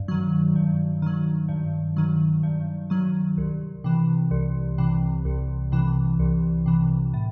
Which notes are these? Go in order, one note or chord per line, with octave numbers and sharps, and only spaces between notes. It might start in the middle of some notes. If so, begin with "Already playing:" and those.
Already playing: G2
D#3 F#3
G2
D#3 F#3
G2
D#3 F#3
G2
D#3 F#3
C2
C3 E3
C2
C3 E3
C2
C3 E3
C2
C3 E3
A2